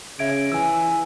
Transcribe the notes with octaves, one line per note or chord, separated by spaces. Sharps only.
C#3 E5 G#6 D7
E3 G#5 E6